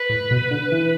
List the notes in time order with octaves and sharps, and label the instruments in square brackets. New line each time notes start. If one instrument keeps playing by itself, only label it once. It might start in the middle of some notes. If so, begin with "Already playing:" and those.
Already playing: [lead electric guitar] B4
[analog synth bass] A2
B2
D3
E3